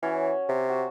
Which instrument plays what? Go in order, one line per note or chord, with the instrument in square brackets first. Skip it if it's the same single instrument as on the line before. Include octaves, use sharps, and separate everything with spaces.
[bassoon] E3 [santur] C#4 F#4
[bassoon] C3
[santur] F#4